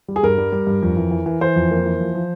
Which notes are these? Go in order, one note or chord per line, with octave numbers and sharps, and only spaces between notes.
G3
G#4
G2 A#4
G3
G3
G2
F2
E3
E3
E3
E3 C5
F2
A#3
E3
F3
F3